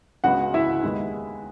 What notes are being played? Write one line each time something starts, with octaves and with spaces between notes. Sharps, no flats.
C#2 C#3 G#3 B3 F#4 F#5
E4 E5
D#2 D#3 G#3 B3